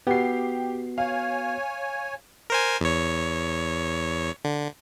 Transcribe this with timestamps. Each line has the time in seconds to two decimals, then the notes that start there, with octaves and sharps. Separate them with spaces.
0.07 B3 F#4 G4 C7
0.98 C#5 F5 G#5
2.50 A#4 C5 G#5
2.81 E2 C#5
4.45 D3